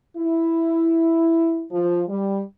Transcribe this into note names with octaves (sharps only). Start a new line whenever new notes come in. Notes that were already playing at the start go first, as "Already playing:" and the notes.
E4
F3
G3